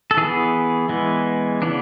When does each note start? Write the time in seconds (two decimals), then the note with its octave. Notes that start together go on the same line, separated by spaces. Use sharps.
0.11 A4
0.17 E3 B3 G#4
0.89 E3 G#3 B3
1.62 C#3 E3 B3 D4